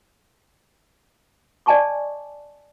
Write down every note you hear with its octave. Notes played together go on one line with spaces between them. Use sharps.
D5 D#5 G#5 A5 C#6 D6